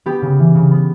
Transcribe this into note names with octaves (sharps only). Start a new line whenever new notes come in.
B3 G4
C#3
E3
C#3
B3